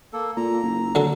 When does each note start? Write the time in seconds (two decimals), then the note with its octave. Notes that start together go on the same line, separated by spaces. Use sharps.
0.13 A#3 A4
0.37 A#2 A#5
0.63 F#1
0.95 D3 F#3 A4 A5